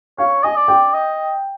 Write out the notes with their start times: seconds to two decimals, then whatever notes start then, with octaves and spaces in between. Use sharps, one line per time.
0.18 C#5 F5
0.44 D#5 G#5
0.56 D5
0.68 G5
0.94 D#5